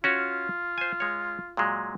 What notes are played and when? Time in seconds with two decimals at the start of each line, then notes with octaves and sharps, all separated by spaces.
0.04 C#4 F4 F#4 C#5
0.78 C5 G#5
1.00 G#3 C#5
1.57 A#2 F#3 G#3